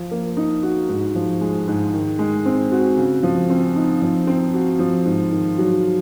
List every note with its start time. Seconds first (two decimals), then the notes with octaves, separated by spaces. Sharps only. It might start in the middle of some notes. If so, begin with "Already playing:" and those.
Already playing: F3
0.11 A#3
0.37 D#4
0.63 F#4
0.89 G#2
1.15 F3
1.41 G#3
1.68 G#2
1.94 D#3
2.19 G#3
2.46 C4
2.72 F#4
2.97 C#3
3.23 F3
3.50 C4
3.76 D#4
4.02 F3
4.27 C4
4.54 F#4
4.79 F3
5.05 G#2
5.32 D#3
5.58 F#3